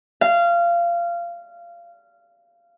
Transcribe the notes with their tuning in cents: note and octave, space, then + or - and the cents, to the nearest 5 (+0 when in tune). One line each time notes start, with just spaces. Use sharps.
F5 -20